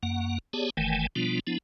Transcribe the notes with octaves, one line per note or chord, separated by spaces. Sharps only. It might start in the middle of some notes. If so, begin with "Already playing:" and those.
F#2 A#3 F#5
B3 G4 G#4 C#5 D5 A5
F#1 D#3 E3 A3 G5 G#5
B2 F3 G3 B3 D4 F4
F3 B3 D4 E4